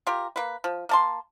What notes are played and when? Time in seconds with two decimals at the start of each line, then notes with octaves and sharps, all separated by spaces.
0.07 F4 G4 A#4
0.36 A#3 B4
0.64 F3
0.89 A#3 A5 C6